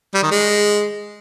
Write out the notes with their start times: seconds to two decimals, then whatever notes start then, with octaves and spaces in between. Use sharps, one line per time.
0.14 G3
0.23 D#3
0.31 G#3